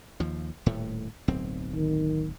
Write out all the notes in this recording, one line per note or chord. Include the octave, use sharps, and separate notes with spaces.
D#2 F3
D#1 A2 A3
D1 B1 C4
D#3